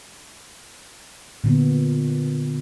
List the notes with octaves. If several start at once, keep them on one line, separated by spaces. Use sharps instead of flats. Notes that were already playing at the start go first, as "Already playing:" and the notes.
A#2 D3 B3